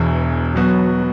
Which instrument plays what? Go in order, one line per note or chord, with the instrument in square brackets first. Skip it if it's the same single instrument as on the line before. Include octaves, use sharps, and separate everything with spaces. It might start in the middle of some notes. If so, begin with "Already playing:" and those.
Already playing: [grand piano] E1 E2 B2 [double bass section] E3
[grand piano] B2 B3 F#4 [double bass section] F#3